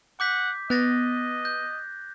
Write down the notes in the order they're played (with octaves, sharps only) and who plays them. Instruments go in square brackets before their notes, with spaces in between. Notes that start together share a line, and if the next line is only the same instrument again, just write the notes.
[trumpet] F#5 [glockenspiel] D6 G6 B6
[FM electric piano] B3 [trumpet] D#5 [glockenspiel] F#6 A6 A#6
[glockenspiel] G6